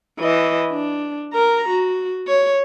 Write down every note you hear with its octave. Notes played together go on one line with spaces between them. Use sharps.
E3 D#5
D4
A#4 A#5
F#4
C#5